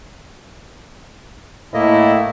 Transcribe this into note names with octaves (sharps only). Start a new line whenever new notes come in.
A2 A#3 E4 D#5